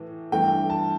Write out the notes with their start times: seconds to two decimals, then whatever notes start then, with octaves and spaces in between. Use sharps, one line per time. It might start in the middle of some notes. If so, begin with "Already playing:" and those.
Already playing: A2 E3
0.32 G2 E3 A3 G5
0.70 A5